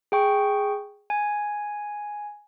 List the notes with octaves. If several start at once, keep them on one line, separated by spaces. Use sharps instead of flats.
G#4 G5 C#6
G#5